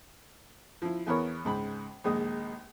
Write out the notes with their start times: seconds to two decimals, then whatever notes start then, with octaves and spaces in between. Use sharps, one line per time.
0.82 F3 E4
1.07 E2 E3 B3 A#4 C#5
1.45 C#2 G#2 B5
2.04 A#1 D#2 G#3 D#6